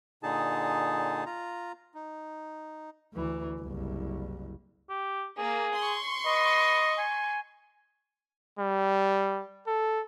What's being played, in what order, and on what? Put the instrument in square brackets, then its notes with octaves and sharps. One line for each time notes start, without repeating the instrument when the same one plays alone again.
[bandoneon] A#2 D3 D#4 G#4 A5
F4 A#5
D#4
[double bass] D2 E3
F#1 C2
[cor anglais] G4
[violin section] A#3 [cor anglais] G#4
[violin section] C6 C#6
[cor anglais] B4 [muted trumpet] D#5
[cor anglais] G#5
[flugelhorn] G3
A4